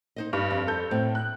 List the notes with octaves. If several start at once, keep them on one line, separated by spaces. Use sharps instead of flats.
D#4 C5 D#5
G2 D#4
F2
A4 G6
A2 C4
F#6